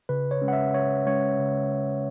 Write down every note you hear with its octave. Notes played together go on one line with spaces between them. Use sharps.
C#3 B4
C#5
G#3 C#4
F#5
E5
C#3 C#5
G#3 C#4 C#5
C#3